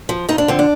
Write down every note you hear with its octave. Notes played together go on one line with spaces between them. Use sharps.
F3
F2 D#4
D4
D3 F3 C4
D4